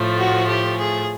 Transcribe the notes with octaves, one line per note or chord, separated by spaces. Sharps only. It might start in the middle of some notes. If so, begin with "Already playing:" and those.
Already playing: A2 F3 A3
F#4
G4
G#4